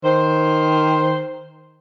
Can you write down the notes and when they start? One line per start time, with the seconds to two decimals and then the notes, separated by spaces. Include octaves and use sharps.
0.04 D#3 C5